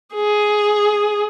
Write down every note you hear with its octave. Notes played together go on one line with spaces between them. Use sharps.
G#4